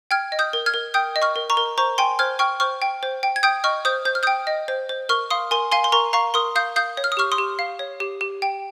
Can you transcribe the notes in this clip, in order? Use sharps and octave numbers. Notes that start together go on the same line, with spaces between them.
G5 F6 G#6
D#5
D#6 G6
A#4
F6 G#6
A#4
G5 D#6 G6
D#5
C#6 F6
A#4
A#5 C#6
A#4
C5 A#5 C#6
G5 G#5 C6
C5 F6 G#6
G5 C#6 F6
C5 C#6 F6
G5
C5
G5
G#6
G5 D#6 G6
D#5 C#6 F6
C5 D#6 G6
C5 G6
F6
G5 D#6 G6
D#5
C5
C5
A#4 C#6 F6
F5 C6 D#6
A#4 G#5 C6
F5 G#5 C6
C6
A#4 A#5 C#6
F5 A#5 C#6
A#4 C6 D#6
F5 D#6 G6
F5 D#6 G6
C#5
F6
D#6
G4 C#6 F6
C6 D#6
G4
F5
C#5
G4
G4
G5